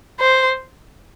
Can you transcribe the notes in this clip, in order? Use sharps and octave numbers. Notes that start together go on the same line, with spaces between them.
C5